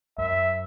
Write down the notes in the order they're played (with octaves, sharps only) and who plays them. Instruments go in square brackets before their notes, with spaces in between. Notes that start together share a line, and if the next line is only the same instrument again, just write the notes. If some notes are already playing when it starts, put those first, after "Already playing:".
[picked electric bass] F#2 [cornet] E5